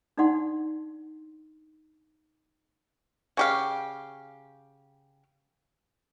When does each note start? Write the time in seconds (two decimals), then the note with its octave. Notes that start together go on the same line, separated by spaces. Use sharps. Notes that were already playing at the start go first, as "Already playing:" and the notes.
0.17 D4 D#4 D5 F#5 C6
3.37 C#3 G4 F5